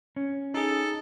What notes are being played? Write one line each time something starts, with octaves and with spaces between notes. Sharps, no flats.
C#4
D#4 G#4 A4